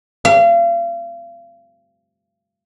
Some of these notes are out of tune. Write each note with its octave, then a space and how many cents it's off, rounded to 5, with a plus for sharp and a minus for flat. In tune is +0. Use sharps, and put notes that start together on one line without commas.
F5 -35